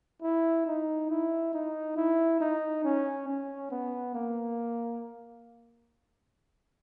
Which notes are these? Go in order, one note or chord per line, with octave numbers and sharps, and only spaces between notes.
E4
D#4
E4
D#4
E4
D#4
C#4
C#4
B3
A#3